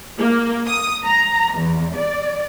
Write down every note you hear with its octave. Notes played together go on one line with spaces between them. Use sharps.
A#3
D#6
A#5
E2
D5